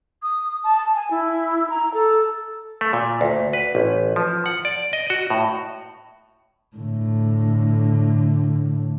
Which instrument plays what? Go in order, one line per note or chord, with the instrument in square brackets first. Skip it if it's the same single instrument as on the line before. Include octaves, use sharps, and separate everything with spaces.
[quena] D#6
A5
G#5
E4
A#5
A4
[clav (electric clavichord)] A3
A#2
D2
B4
A1
F3
F#5
D5
D#5
F#4
A2
[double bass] A2 D3